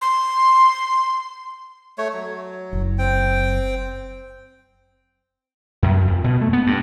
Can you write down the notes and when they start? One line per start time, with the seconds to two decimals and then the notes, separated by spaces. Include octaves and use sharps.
0.02 C6
1.98 A3 C#5
2.13 F#3
2.72 F#1 F#2
2.98 C4 G5
5.83 F#2
6.08 F2
6.24 B2
6.41 A3
6.53 B3
6.67 G2